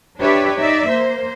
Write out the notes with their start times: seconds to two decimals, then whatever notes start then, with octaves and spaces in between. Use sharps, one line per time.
0.21 D4 G4 B4 C#5 D5 E5
0.57 D#4 D5 E5
0.90 A#3 C5